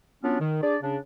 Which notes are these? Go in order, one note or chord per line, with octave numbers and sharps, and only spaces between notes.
F#3 B3 C#4 D4 F4
D#3
D4 G#4 D5
C#3 D4